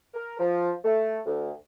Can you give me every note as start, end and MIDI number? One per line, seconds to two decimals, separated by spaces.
0.14 0.36 70
0.39 0.71 53
0.84 1.18 57
1.26 1.51 38